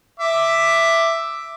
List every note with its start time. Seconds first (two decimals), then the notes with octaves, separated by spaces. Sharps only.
0.20 E5 D6